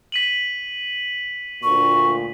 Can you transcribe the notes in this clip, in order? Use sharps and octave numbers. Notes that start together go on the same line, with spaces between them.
B6 D#7 F#7
D2 A#2 C#6